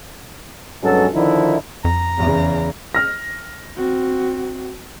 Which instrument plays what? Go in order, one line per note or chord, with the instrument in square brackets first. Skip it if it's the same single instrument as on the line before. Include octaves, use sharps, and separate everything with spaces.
[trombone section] B1 G2 F#3 G#3 C#4 A4
D3 D#3 F3 D#4 E4
[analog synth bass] F2 [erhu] A#5
[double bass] E2 C#3
[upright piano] F6 A#6
[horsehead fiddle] C4 F#4